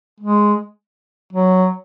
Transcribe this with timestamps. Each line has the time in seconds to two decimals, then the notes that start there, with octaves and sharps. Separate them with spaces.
0.20 G#3
1.33 F#3